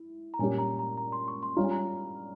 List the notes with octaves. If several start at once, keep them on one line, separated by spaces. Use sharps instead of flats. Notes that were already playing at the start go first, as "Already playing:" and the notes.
Already playing: E4
A#5
A#2 G3 C#4 G4 G#5
A#5
A#5
A#5
C6
C#6
C6
G3 C#4 F4 A#5
G#5
A#5